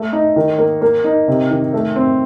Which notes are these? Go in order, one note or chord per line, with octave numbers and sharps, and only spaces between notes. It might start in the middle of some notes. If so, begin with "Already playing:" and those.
Already playing: A3
D#4
D#3
A#3
A#3
D#4
C3
D#3
A3
C4